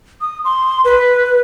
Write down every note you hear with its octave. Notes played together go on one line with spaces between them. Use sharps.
D#6
C6
B4